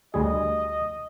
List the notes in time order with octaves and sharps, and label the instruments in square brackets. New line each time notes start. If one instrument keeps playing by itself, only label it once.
[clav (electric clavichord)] D2 G3 G#4 [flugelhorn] D#5